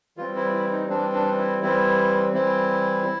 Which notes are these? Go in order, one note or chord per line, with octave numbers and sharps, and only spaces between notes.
E3 G3 C4 F4
E4
E4
D#4
E3 G3 C4 D4
D4
E4
E3 G3 C4 E4
E3 G3 C4 E4